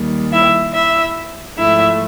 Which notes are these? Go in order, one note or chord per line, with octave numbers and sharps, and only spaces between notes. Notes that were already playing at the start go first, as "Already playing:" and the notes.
Already playing: D#2 D#3 G3
E4 E5
E4 E5
G#2 F3 A3 E4 E5